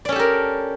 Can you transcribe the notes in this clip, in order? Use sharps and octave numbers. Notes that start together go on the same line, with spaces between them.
C#4 G4 A4 A#4 D5